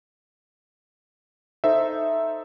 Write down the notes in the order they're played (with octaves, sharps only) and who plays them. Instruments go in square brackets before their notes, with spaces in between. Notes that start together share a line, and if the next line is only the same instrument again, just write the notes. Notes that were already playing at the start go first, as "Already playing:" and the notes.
[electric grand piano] D#4 A4 C5 E5